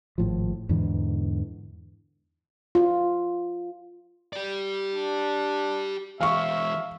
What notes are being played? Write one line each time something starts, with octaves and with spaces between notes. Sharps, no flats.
G#1 A2 F3
E2 G#2 D3 E3
F4
G4 D5
D4
E3 G#3 E5 F5 C#6